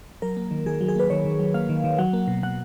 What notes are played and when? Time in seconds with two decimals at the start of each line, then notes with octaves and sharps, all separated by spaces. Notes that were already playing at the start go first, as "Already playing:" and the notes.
0.22 F#3 A#4
0.37 A#3
0.51 D#3
0.66 D#3 G#4
0.81 F#3
0.88 G#4
0.95 A#3 B4
1.10 D#3 C#5
1.25 D#3
1.40 F#3
1.54 A#3 F5
1.69 D#3
1.84 D#3
1.98 F#3 F#5
2.13 A#3
2.28 B2
2.43 B2 F#5